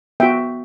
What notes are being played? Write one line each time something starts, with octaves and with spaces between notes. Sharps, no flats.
B3 F#4 E5 G5